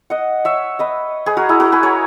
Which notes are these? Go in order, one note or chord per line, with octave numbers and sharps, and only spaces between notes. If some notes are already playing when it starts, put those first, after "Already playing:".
D#5 F#5
C#5 E5
B4 D#5
G#4 B4
F#4 A#4
E4 G#4
F#4 A#4
G#4 B4
A#4 C#5